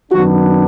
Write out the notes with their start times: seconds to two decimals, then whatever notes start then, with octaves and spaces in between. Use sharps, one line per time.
0.12 F#2 D#3 F#3 B3 D4 F#4